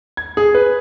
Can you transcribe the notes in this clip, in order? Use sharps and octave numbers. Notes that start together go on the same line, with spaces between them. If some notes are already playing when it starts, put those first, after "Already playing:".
G#6
G#4
B4